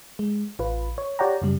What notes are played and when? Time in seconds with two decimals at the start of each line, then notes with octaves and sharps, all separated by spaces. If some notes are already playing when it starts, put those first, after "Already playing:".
0.19 G#3
0.59 A1 F4 B4
0.98 C#5
1.19 G4 C#5 D5 F#5 G5 A#5
1.42 F#2 C#3 G3